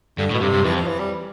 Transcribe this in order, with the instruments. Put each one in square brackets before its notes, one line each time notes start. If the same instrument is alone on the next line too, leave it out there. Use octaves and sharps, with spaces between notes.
[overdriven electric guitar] G2 [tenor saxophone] D3
[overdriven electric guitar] A2
[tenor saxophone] B2
[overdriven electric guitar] G2 [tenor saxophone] C3
[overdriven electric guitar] G2
[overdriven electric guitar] F2 [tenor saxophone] E3
[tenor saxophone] F3
E3
G3